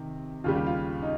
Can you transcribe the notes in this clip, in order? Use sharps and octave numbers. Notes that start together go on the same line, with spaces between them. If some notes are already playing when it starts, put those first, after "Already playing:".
Already playing: C3 D#3
D#2 C#3 G3 F4
G4
F4
D#4